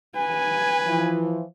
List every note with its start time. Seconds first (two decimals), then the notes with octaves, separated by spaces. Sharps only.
0.16 B4 G#5
0.87 E3 F3